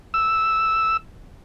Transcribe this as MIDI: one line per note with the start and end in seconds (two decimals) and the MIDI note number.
0.14 0.97 88